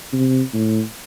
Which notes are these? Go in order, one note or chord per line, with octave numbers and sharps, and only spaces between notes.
C3
A2